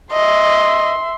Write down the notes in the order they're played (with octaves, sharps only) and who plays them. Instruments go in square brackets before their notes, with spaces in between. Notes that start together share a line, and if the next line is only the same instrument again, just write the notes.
[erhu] D#5 [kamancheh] E5 C6